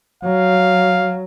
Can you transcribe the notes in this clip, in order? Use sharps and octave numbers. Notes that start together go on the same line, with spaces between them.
F#3 F5